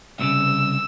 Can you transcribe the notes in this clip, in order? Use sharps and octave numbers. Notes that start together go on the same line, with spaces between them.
C2 A2 C#3 E6